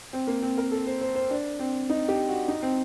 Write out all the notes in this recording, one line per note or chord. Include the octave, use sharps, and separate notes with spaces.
C4
A#3
C4
A#4
A4
C5
C5
C5
D4
C4
D#4
G4
F#4
D#4
C4